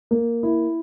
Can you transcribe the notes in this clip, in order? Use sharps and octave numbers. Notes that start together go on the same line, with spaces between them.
A#3
E4